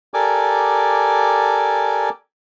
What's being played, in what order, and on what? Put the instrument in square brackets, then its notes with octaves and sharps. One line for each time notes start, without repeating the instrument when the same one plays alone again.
[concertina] G4 A4 A#4 D5 G#5 D6